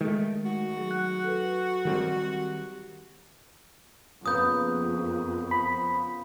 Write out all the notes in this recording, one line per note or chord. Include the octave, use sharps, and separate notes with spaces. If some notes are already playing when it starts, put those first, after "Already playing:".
D#3 G#3 A3
F#4
F#3 G#4
F#5 F#6
A4 B4
D#3 G3 C4 G4 A#4
F2 C#3 A#3 B3 D#6 G6
F3 B5